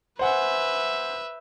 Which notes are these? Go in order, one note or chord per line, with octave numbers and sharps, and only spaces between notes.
B4 C5 E5 F#5 G#5